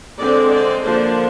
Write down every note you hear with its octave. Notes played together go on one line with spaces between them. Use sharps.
D3 G#3 C4 D5
D5
D3 F3 A#3 D4 C5